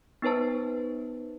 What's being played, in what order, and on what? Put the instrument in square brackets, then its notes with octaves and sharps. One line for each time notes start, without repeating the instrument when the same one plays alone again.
[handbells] B3 D#4 B4 C5 A5